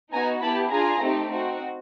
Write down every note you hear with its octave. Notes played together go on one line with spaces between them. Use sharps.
B3 D#4 F#4 G#5 A#5
B3 E4 G4 A5 B5
D4 F4 G#4 G#5 A#5
A3 C4 D#4 G4
C4 D#4 F#4